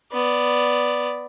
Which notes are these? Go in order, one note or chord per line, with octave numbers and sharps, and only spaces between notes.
B3 D5